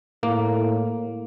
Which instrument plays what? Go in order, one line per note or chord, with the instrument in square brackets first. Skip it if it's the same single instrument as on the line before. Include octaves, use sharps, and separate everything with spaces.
[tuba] A2 [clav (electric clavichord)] A#3